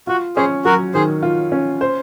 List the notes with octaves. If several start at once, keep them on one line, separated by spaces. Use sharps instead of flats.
F4 F#4
C#4 G#4 C5
F#3 F#4 A#4
D#3 G#4 C5
F4
C#4
C5